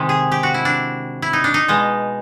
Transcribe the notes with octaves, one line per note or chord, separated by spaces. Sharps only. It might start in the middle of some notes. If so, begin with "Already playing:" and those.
Already playing: C3 D#3 G#3
G#4
G4
F#4
E4
D4
E4
D#4
D4
D#4
B2 G#3